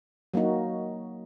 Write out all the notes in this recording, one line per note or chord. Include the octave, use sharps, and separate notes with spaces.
F#3 A#3 D#4 F#4